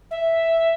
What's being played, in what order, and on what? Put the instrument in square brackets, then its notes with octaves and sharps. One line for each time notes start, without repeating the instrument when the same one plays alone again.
[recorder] E5